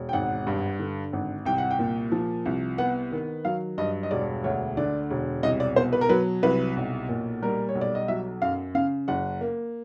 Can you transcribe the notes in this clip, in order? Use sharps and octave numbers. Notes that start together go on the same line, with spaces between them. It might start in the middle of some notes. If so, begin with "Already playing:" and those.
Already playing: E1
G5
G#1 F#5
G2
D3
G#1
C2 G5
F#5
G5
A#2
F3
C2
B3 F#5
D#3
F#3 F5
G2 D#5
D#5
E1 D5
D2 C#5
D3 D5
E1
C2 D#5
D5
B2 C5
B4
A#4
F#3 B4
C2 B4
B1
A#2
G3 A#4
C#5
B1
D5
D#5
F#3 E5
F#2 F5
C#3 F5
F#1 F#5
A#3